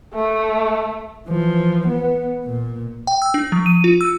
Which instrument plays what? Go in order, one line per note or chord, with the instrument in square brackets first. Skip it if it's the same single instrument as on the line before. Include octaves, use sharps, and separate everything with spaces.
[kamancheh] A3
[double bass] E3 F3
B3
A#2
[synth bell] G5
E6
D4
F3
D#7
F4
E6